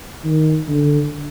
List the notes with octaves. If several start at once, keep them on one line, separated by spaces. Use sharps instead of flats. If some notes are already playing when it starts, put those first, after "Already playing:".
D#3
D3